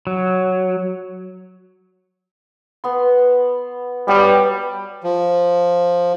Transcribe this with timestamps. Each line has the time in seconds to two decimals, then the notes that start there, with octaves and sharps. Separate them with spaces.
0.07 F#3
2.84 B3 C6
4.08 F#3 G3 B3 G4
5.04 F3